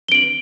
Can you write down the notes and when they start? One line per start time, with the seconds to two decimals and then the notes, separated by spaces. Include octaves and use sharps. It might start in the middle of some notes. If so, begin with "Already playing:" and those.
0.08 G7
0.12 D7
0.15 F#7